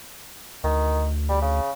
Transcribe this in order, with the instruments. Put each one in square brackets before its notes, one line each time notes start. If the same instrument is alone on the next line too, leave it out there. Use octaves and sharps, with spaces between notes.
[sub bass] D2 [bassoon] D#3
[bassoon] G3
C#3